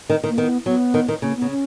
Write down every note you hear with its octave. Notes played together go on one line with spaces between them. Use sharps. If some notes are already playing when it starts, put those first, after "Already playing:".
D#3
D#3
A#3
D#3 B3
F#3 B3
D#3
D#3
C#3 A#3
B3
C#3
C#4